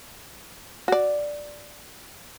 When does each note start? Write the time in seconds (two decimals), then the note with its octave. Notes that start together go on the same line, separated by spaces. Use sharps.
0.88 F#4 D5